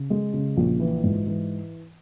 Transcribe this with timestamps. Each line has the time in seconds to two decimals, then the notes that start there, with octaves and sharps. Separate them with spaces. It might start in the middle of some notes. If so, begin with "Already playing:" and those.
Already playing: C#3
0.10 G#3
0.33 C#3
0.57 A#1
0.80 E3
1.04 G#2
1.27 E3